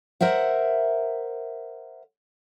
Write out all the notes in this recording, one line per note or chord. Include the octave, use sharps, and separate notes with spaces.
A#4 C5 E5 F#5